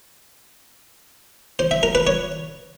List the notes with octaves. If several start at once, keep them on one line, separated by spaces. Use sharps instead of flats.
C5
E5
A#4
B4
C#5